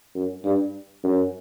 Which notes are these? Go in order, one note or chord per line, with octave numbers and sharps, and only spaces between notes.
F#2
G2
F#2